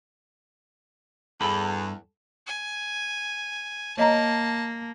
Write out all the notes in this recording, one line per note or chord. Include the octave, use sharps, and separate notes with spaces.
E2 G2 A4 B5
G#5
A#3 C#5 D#5 A5 A#5